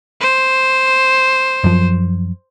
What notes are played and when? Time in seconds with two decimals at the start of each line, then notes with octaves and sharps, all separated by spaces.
0.21 C5
1.64 F#2 F3